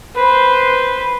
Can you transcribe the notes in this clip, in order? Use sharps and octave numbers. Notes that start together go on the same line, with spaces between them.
B4 C5